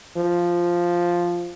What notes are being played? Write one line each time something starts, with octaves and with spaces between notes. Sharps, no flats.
F3